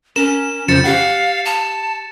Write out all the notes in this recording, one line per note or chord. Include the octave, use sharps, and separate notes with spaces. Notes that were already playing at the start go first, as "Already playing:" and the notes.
C#4 A#4 E7
F2 C#3 F3 C5 A6 C#7 E7
G4 F5 F#5
A5